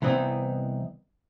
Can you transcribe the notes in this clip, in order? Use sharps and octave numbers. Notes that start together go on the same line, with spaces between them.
C2 E3 B3 C4 D#4